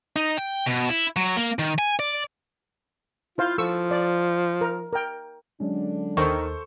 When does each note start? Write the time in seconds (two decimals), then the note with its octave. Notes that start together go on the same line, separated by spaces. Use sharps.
0.16 D#4
0.38 G5
0.67 B2
0.89 E4
1.16 F#3
1.37 A#3
1.59 D#3
1.79 G#5
1.99 D5
3.38 E4 F4 C5 F5
3.58 F3 A4 C#6 E6
3.91 D5
4.61 A#4
4.93 A#4 G5
5.60 D3 F#3 G#3 C#4 D4
6.17 D#2 D#3 A4 C5 C#6